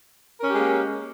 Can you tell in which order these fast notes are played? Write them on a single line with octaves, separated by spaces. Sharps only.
A#4 C#4 G4 G#3 A#3